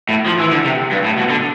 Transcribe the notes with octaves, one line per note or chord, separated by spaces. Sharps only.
A2
F3
E3
D3
C3
G2
A2
B2
D3